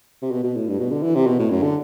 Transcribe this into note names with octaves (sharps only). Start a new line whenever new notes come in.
C3
B2
B2
A2
G2
B2
D3
E3
C3
B2
A2
F#2
D3